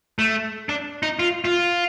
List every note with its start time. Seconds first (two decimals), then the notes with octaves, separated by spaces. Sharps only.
0.19 A3
0.69 D4
1.03 D#4
1.19 F4
1.45 F4